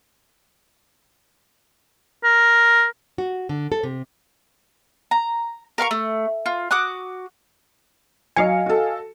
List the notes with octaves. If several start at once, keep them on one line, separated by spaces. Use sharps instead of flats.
A#4
F#4
D3
A4
C3
A#5
A#4 F5 C6 C#6
A3
F4
F#4 D6 D#6 F#6
F#3 D#5 F5 G#5 C#7
F#4 A4